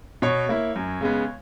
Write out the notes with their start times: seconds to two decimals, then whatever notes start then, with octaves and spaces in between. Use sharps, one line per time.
0.22 B2 C#5
0.49 A#3 E4
0.76 F#2
1.01 C#3 G#3 B3